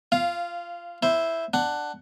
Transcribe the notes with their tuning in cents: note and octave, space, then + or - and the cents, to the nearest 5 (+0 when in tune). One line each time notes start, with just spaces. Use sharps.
F4 -15 F5 +0
E4 +0 C5 +0
D4 +5 F#5 +10